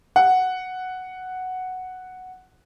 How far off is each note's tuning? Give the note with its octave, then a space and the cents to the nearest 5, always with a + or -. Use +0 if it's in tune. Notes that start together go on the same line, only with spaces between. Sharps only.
F#5 +0